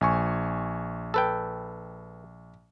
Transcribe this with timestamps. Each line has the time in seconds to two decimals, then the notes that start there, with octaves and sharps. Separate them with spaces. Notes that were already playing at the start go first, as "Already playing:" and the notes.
0.01 A#1 G#5 C#6
1.14 A4 B4 G5